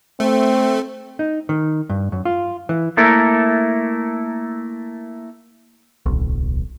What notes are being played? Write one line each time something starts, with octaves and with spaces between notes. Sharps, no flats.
A3 C4
D#4
D#3
G2
F#2
F4
E3
A3 A#3 E4 A4 A#4
D1 B1